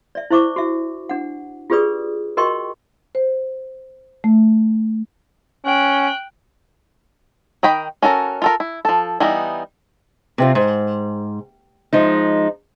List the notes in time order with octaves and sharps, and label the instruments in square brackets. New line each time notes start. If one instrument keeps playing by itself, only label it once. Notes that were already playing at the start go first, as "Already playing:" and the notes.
[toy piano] D5 E5
E4 C5 E5 C#6 D6
F#4 E5
D4 F#5
F4 G4 G#4 B4 D5 D#6
F#4 A#4 D#5 G5 C6 C#6
[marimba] C5
A3
[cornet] C#4 [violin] G5 F#6
[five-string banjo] D#3 D#5 G5 B5
C#4 F#4 A4 A#4
F4 A4 A#4
E4
F3 A4
E3 G3 B3 D#4
[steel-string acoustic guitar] C3 C4 F4
G#2
F3 G#3 D#4